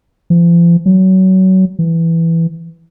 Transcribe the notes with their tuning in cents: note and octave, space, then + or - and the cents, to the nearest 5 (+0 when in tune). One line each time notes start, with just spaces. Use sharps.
F3 -40
F#3 +25
E3 +5